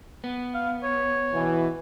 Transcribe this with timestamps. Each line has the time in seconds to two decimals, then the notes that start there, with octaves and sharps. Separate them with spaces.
0.24 B3
0.54 F5
0.83 C#5
1.33 B2 E3